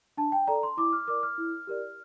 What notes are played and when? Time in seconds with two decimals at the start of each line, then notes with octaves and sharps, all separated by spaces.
0.17 D4 A5
0.32 G5
0.47 A4 D5 A#5
0.63 C6
0.77 E4 D6
0.93 F6
1.08 A#4 D5 D6
1.23 F6
1.38 E4
1.67 G4 A#4 D5